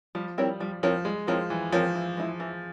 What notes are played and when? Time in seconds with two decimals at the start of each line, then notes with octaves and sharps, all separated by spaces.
0.15 F3 G3
0.38 G3 C4 E4 A#4 C#5
0.60 F3 G3
0.83 F3 C4 E4 A#4 C#5
1.05 G3 G#3
1.27 F3 C4 E4 A#4 C#5
1.50 E3 G3
1.72 F3 C4 E4 A#4 C#5
1.95 E3
2.17 G#3 E4
2.40 E3